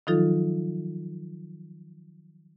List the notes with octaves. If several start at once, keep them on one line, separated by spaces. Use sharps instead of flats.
D#3 F3 F#3 D#4 F4 A4